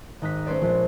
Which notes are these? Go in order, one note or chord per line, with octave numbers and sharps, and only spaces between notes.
G#1 D#4 F#6 B6
A3 C#4 B4 C5 D5
A#1